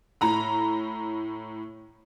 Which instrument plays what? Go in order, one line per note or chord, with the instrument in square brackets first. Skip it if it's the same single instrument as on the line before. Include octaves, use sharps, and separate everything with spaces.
[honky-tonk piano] A2 A#5 B5